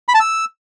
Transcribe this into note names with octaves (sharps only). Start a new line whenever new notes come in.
B5
A5
E6